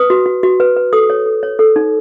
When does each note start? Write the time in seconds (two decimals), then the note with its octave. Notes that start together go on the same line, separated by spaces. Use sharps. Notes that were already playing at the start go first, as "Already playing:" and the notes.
Already playing: B4 D#6
0.10 F#4
0.26 F#4
0.43 F#4
0.60 B4
0.76 B4
0.93 A4 D#6
1.10 C#5
1.26 A4
1.43 C#5
1.59 A4
1.76 D#4